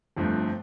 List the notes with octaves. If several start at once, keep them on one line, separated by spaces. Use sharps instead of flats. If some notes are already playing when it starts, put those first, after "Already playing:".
G1 G2 F3 A3 C4